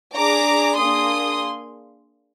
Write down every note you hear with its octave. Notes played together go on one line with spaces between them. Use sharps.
D4 G#4 A#5 D6
A#3 D4 G#4 C6 D#6